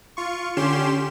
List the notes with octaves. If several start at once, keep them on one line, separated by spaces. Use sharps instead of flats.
F4 C#6
D3 C#4 G4 C6 E7